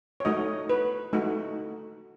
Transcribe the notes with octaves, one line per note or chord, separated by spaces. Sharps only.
C#5
A3 D#4 F#4 D#5
B4
A3 D#4 F#4